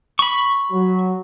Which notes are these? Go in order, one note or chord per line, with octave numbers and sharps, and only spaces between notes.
B5 C#6
F#3